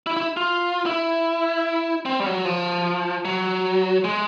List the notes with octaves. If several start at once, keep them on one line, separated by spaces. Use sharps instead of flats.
E4
E4
F4
E4
C4
G3
F#3
F3
F#3
G#3